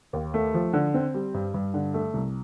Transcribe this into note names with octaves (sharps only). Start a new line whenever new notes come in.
D#2
A3
F3
D3
C4
G3
G2
G2
D3
A3
C2